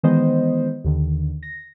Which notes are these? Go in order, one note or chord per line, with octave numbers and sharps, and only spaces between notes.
D#3 E3 G#3 B3 C5 D#5
D#2 D3 D#3
A#6